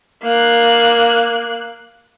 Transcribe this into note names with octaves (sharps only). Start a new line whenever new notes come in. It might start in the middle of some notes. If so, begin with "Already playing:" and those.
A#3 F#6